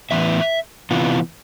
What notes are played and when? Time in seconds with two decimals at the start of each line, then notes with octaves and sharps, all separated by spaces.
0.11 A2 E3 B3 E5
0.91 C3 E3 B3 F4